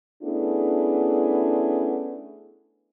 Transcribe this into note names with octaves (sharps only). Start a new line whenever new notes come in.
A3 B3 C#4 D4 E4 G#4